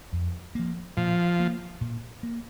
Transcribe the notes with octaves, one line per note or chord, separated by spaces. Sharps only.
F2
F3 A#3
A#2 F3
A#3
A#2
A#3